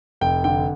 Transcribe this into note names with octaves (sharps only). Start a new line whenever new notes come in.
F1 G5
D3 G5